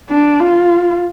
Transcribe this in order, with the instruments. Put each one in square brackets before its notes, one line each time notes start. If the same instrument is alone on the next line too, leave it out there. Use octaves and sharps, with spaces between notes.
[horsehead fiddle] D4
F4